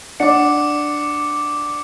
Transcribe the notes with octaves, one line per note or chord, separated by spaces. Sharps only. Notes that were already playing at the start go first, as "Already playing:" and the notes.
D4 F#5 D6 C#7